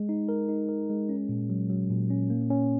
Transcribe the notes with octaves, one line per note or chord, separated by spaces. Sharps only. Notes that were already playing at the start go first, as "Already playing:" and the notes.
Already playing: G#3
D#4
A#4
D#4
A#4
G#3
C#4
A#2
F#3
F#3
A#2
C#4
A#3
C#4